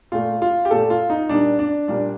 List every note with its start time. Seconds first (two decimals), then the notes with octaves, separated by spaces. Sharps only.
0.12 A#2 A3 F4
0.42 F4
0.65 G4
0.71 A#2 A3 A4
0.90 F4
1.10 D#4
1.29 A#2 G3 A#3 D4
1.59 D4
1.88 A#2 G3 A#3 D4